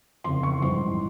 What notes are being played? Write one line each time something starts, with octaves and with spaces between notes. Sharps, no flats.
F1 E2 C#3 C6
C#6
A#1 G#2 E3 G3 C6